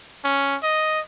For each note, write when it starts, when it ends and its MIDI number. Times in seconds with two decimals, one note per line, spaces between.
0.25 0.56 61
0.63 1.01 75